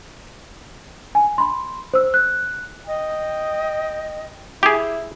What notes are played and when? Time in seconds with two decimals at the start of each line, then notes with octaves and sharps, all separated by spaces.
1.15 G#5
1.38 B5 C6
1.94 C5 E6
2.14 F#6
2.87 D#5 G5
4.63 E4 G4 G#4